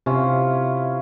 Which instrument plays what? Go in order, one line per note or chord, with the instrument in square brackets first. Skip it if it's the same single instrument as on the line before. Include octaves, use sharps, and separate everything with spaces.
[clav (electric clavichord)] C3 [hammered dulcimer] C#4 E4 F4